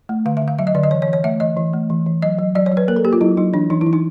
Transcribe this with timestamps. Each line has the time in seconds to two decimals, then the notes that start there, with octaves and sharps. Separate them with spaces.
0.09 A3
0.25 D3 F5
0.37 E5
0.42 D3
0.48 F5
0.59 F#3 E5
0.67 D#5
0.75 D3 D5
0.83 D#5
0.91 E3 C#5
1.02 C#5
1.08 E3
1.13 C#5
1.24 A3 E5
1.40 E3 D#5
1.57 E3
1.73 A3
1.90 E3
2.06 E3
2.22 F#3 D#5
2.39 F#3
2.55 F#3 D5
2.66 C#5
2.72 F#3
2.77 B4
2.88 A#3 A#4
2.96 A4
3.04 A#3 G4
3.13 F4
3.21 F#3 E4
3.37 F#3 D#4
3.53 E3 D4
3.70 E3 D#4
3.81 E4
3.86 E3
3.93 D#4